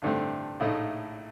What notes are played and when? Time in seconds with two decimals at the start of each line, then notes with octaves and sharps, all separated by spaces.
0.02 A1 G2 D3 A3 C4
0.60 A#1 A2 A3 D#4